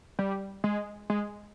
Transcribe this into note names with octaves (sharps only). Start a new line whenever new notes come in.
G3
G#3
G#3